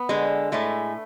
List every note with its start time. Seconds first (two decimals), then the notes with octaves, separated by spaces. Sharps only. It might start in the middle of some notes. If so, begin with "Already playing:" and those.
Already playing: B3
0.09 D3 G#3
0.52 A2 G#3 A3